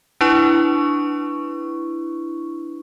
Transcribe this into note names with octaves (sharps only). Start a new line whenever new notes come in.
D4 E4 B4 C#6